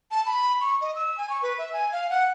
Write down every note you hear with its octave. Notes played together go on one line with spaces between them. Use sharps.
A5
B5
C#6
D#5
E6
G#5
C#6
B4
E5
G#5
F5
F#5